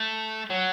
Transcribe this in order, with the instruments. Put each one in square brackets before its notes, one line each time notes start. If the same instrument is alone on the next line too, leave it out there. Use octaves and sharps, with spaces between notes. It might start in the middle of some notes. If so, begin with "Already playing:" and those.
Already playing: [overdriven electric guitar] A3
F#3